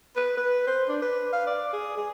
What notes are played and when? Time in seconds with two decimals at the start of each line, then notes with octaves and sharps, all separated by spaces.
0.16 B4
0.37 B4
0.67 C5
0.89 D4
1.02 B4
1.33 F5
1.47 D5
1.73 G#4
1.97 G#4